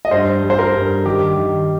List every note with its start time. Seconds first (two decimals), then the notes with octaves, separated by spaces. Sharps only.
0.05 D#5
0.11 G2 C5
0.43 G3
0.50 C5
0.59 A#4
0.74 G2
1.06 D#3 G4
1.37 D#3